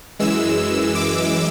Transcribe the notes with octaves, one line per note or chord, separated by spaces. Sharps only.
F#2 E3 G#3 E6
D6